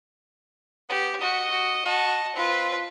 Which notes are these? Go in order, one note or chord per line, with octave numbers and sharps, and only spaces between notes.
B3 G4
F#4 D#5
F#4
F#4 D#5 A5
C4 F4 B4